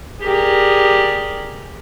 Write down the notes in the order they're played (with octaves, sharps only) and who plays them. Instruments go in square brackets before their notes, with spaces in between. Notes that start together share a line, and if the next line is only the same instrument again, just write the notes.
[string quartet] G4 G#4 A#4 D5